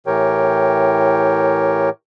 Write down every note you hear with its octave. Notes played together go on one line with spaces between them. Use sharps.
A2 E3 G4 A#4 C#5 G5